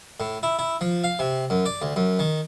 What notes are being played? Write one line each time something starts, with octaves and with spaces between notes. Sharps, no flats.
A2
E4
E4
F3
F5
C3
F#2
D5
D2
F#2
D#3